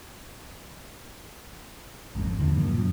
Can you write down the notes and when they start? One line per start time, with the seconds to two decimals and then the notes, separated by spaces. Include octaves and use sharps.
2.15 G#1 F2
2.39 D#2 D3 F3
2.56 F#2 A#2 F3
2.74 F#2